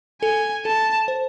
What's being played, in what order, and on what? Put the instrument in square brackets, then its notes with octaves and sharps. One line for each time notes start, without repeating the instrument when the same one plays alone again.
[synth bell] A4 [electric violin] G#5
[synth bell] A4 [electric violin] A5
[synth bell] C5